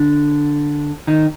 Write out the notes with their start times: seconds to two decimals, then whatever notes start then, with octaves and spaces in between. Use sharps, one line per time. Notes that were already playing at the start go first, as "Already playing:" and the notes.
Already playing: D3 D4
1.07 D#3 D#4